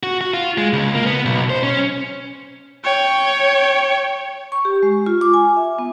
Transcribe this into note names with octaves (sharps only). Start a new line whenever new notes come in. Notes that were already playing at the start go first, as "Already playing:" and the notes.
F#4
F#4
F4
G#3
C#2
A#3
B3
B1
C5
C#4
C#5 G5
C#6
G4
G#3
F4
D6
G#5
E5
B3